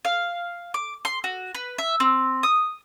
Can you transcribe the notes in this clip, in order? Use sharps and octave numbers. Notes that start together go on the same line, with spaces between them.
F5
D6
C6
F#4
B4
E5
C4
D#6